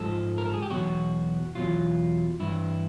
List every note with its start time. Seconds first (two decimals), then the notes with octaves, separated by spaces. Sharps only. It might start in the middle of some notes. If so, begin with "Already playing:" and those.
Already playing: G#2 F3 A4
0.38 A#4
0.46 A4
0.54 G#4
0.62 G4
0.70 E2 B2 F#3 F#4
1.55 E2 B2 F#3 F4
2.40 G2 E3 E4